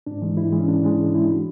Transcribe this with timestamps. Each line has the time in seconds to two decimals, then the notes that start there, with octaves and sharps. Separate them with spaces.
0.07 G#2 D4
0.22 E3 G#3
0.37 G#2 E4
0.53 E3 G#3
0.59 C#4
0.68 G#2 D4
0.83 E3 G#3 D4
0.99 G#2
1.14 E3 G#3 E4
1.30 F#4